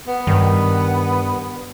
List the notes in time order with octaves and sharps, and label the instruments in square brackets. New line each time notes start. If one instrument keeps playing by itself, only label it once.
[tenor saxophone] B3
[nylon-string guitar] G2 [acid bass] D#3